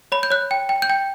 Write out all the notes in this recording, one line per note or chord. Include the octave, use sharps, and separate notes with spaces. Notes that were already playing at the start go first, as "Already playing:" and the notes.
C#5 B5
G6
C#5 F#6
G5
G5
G6
G5